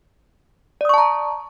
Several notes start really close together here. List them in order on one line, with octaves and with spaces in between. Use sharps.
D5 D#6 C#6 A5 A#5